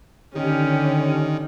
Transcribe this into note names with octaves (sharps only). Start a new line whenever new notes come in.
D3 D#3 C#4 G4